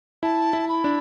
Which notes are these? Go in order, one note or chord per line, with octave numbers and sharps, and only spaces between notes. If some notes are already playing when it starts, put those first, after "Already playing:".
E4 A5
E4
B5
D4